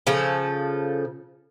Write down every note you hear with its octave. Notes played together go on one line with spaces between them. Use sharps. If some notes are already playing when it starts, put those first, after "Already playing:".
C#3 F3 A4